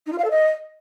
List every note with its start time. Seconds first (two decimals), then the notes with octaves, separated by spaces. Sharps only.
0.06 D#4
0.12 F4
0.18 F5
0.24 A4
0.30 D#5